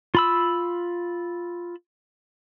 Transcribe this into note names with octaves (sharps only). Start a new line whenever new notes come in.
F4 B5 E6